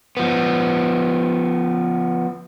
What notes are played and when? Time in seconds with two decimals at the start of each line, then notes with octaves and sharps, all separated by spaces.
0.17 F3 B3